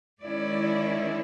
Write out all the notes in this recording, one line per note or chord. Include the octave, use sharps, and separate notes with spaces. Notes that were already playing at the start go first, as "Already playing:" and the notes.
D#3 G#3 C#4 E4 D5